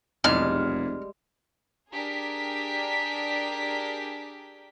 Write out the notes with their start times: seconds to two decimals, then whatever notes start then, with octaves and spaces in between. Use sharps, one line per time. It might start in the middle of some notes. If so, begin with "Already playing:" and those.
0.24 F1 B1 E2 G3 G#3 F6
1.94 D4 G4 G#4 A#4 B6